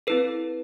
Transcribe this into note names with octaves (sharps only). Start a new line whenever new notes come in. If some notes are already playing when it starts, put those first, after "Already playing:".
C4 E4 A4 B4